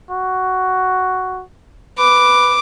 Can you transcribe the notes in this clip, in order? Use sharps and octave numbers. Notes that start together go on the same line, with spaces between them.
F#4
B4 D6